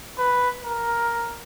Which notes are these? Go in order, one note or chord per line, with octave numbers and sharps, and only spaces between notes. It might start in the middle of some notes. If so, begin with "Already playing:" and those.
B4
A#4